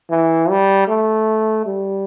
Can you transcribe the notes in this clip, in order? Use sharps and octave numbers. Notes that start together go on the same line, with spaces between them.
E3
G3
A3
G3